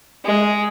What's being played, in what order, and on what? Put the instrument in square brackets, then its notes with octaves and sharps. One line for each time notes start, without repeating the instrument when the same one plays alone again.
[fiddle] G#3